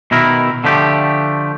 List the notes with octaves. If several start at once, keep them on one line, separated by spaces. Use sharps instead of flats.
B2 D#3 E4 A#4
D3 F3 A3 G4